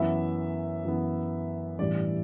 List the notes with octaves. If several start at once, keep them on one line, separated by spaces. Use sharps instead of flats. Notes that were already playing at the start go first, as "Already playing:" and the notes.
Already playing: F#2 E3 B3 E5
F#2 E3 B3
A1 G2 E3 G3 D5